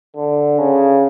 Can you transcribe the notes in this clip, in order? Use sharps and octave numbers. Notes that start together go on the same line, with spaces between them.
D3
C#3